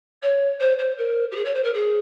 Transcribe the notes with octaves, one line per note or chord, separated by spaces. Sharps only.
C#5
C5
C5
A#4
G4
G#4
C#5
C5
A#4
G#4